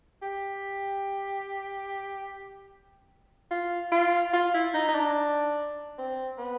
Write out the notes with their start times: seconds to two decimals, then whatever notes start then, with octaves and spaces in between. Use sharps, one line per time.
0.22 G4
3.51 F4
3.92 F4
4.34 F4
4.54 E4
4.74 D#4
4.89 D#4
4.95 D4
5.98 C4
6.38 B3